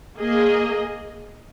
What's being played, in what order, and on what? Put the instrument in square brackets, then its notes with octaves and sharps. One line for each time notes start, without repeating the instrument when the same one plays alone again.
[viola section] A#3 G#4 D#5